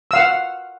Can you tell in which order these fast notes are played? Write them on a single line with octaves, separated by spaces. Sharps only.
E6 F5 F#5